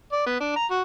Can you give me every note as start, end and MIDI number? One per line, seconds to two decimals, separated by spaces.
0.12 0.24 74
0.26 0.40 59
0.40 0.55 62
0.56 0.66 82
0.71 0.82 66